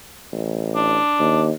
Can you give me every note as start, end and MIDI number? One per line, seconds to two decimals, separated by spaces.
0.33 0.99 33
0.75 1.46 62
1.19 1.51 39